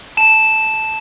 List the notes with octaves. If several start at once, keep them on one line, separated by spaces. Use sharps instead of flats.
A5 E7